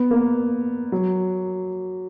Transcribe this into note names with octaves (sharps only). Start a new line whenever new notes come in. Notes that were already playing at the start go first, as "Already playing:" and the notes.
Already playing: B3
A#3
F#3